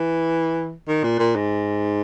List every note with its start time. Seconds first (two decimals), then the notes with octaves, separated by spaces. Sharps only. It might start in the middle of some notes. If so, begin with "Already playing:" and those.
Already playing: E3
0.88 D#3
1.03 A#2
1.19 A#2
1.35 G#2